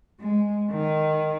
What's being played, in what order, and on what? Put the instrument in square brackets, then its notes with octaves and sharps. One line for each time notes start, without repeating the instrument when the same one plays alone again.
[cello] G#3
D#3